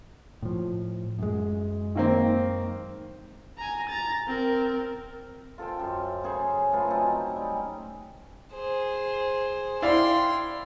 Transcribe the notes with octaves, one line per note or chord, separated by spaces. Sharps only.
A2 F3
F#2 G#3
D#3 A#3 C4
G#5 A#5
A#5 A6
C4 A#4
F4 A4 C5 G5
F#2
C#3 G#4 C5 C#6
A3 F4 B4
F#3 C4 C#4 D#4
G3
G#4 C5
E4 D5 F5 G5 C6